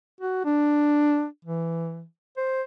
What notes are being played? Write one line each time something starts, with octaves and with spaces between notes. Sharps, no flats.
F#4
D4
E3
C5